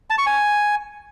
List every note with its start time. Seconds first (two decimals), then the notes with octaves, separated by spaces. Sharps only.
0.10 A5
0.18 C#6
0.26 G#5